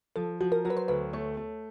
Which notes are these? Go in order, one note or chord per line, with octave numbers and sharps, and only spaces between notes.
F3 A4
F3 F#4
A#4
F#3 A#4
B4
C5
D2 B4
A3 C#5
A3